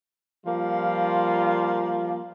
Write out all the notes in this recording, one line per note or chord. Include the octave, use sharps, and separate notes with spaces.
F3 G3 A#3 F4